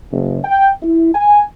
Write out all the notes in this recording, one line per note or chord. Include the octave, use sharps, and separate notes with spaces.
F#1
G5
E4
G#5